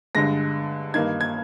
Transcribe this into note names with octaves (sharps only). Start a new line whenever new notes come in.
G2 D3 G#3 A#6
G2 D#3 A#3 D#4 G#6
G#6